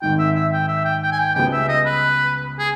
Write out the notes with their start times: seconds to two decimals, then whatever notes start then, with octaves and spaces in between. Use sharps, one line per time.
0.02 G#1 G#2 D#3 G5
0.19 E5
0.35 E5
0.52 G5
0.68 E5
0.85 G5
1.02 G5
1.12 G#5
1.19 G5
1.35 C#2 C#3 G3 B3 G5
1.53 E5
1.68 D#5
1.85 B4
2.58 G#4